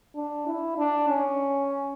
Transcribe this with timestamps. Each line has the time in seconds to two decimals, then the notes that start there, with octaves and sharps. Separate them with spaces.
0.15 D4
0.47 E4
0.77 D4
1.09 C#4